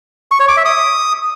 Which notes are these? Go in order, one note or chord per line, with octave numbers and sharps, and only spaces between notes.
C#6
C#5
D6
E5
D#6